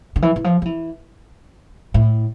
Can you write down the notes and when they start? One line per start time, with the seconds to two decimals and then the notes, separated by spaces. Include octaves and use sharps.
0.16 D3
0.22 E3
0.36 E3
0.44 F3
0.62 F3
0.65 E3
1.94 A2